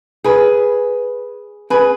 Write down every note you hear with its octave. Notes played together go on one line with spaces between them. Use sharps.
G#4 B4
G#4 B4